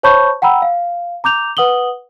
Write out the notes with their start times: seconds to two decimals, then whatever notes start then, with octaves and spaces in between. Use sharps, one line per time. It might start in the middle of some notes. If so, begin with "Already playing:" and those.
0.03 C5 C#5 A5 B5 C#6 G6
0.42 F#5 G5 A#5 B5 E6
0.62 F5
1.24 A#5 D6 G6 F7
1.57 B4 F#5 D#6 F#7 G7